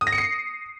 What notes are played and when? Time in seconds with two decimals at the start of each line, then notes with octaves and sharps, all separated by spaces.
0.01 D#6
0.07 A#6
0.12 C#7
0.18 C7